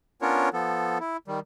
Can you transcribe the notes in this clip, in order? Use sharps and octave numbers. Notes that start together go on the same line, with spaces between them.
B3 C#4 D4 F4 A#4 C#5
F3 B3 A4
E4
D#3 G3